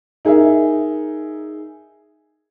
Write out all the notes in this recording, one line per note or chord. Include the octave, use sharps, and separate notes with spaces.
D#4 G#4 A#4 E5